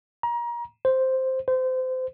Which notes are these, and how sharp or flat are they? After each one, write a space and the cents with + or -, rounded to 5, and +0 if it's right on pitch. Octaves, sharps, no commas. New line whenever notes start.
A#5 +30
C5 +0
C5 -25